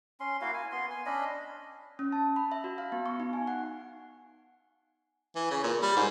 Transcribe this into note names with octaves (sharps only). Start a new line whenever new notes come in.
C#4 C6
A#3 E4 F#4 F5
G#5
B3 C6
G#5
C#4 D4 D#5 B5
C#4
A5
B5
E5
F#4
F5
B3
C#6
D#4
G#5
F#5
E3
C#3
A#2
G3
G#2